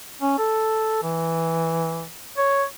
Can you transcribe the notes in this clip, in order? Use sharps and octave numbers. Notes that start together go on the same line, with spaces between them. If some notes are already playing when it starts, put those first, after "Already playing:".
C#4
A4
E3
C#5